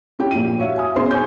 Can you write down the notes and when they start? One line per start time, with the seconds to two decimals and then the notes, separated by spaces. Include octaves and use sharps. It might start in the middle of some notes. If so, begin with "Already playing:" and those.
0.19 C#4 E4 G4 G5
0.31 A#1 D#7
0.58 F#4 C#5 E5 F5
0.77 G#5 D#6
0.95 B1 C#4 D#4 G#4 C5 C6
1.11 G#5 C#6 G6